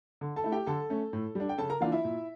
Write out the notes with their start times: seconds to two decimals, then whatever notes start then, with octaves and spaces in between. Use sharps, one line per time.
0.21 D3
0.36 A4 A5
0.44 A3 E4
0.52 G4 G5
0.66 D3 A4 A5
0.90 A3 C#4
1.13 A2
1.35 G3 D4
1.49 G5
1.58 C#3 A4 A5
1.70 A#4 A#5
1.81 E3 A#3 D4 F4 F5
1.92 E4 E5
2.05 A#2